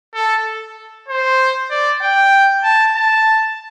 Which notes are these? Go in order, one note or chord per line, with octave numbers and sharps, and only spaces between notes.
A4
C5
D5
G5
A5
A5